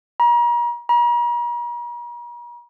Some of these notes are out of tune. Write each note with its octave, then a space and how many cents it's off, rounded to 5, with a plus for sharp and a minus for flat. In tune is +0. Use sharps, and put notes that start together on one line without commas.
A#5 +40
A#5 +45